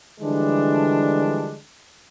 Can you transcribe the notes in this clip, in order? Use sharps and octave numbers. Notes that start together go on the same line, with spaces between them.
D3 E3 F3 G3 G#3 D4